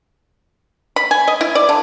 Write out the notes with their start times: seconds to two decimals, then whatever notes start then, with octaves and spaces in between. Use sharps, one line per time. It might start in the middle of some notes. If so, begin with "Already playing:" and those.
0.96 B5
1.11 G#5
1.28 D#5
1.41 E4
1.55 D5
1.69 D3